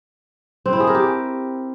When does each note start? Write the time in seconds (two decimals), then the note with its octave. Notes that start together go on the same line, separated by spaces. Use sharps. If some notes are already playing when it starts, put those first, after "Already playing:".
0.66 C4
0.73 E4
0.80 G#4
0.87 A#4
0.95 G4